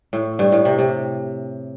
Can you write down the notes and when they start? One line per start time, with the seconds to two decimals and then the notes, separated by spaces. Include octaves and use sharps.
0.13 A2
0.39 G2
0.52 A2
0.65 C3
0.79 C3